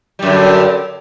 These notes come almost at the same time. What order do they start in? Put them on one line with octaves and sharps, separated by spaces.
G3 F#2 D3